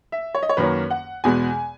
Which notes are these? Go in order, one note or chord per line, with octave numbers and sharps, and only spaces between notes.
E5
C#5
D#5
C#5
F#2 D#3 A#3 C#4 B4
F#5
E2 B2 G#3 B3 G#5